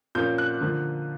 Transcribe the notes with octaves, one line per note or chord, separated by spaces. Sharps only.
A#2 F3 A#3 C#4 G6
F#6
D3 F3 A#3